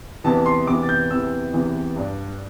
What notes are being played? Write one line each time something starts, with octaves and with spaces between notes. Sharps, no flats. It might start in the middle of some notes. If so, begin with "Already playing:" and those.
E2 C3 E3 A5
C6
E2 C3 E3 D6
A6
G6
E2 C3 E3 E6
E2 C3 E3
G2 G3 D4